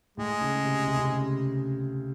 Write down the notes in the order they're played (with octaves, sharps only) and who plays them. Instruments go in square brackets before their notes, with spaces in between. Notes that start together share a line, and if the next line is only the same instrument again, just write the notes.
[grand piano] A2 [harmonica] G#3
[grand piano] C#3
C3
C3
C#3
C3